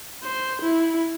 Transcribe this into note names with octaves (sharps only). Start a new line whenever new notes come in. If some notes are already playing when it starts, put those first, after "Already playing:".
C5
E4